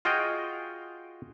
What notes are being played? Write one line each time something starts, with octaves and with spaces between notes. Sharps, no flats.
F4 F#4 G#4 D#5 F5 G5